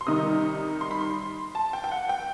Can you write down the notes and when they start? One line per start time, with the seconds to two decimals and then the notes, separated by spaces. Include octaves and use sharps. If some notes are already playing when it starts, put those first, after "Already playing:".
0.01 C6
0.06 C3 D#3 G3 D#4 D#6
0.81 C6
0.91 B5
1.01 C6
1.55 A5
1.73 G5
1.84 G5
1.92 F#5
2.09 G5